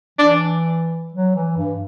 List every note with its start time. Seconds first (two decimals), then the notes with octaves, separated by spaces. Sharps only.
0.19 E3 D4
1.14 F#3
1.35 E3
1.57 G2